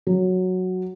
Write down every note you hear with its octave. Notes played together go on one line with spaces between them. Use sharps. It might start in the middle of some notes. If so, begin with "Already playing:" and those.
F#3